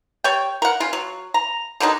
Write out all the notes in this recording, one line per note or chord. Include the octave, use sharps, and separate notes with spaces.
G3 C#5 G5
A#4 F#5
C#3 F4
F#3
A#5
D3 D#3 F#3 D#4